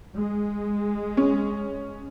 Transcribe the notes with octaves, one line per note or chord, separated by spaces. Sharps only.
G#3
C#4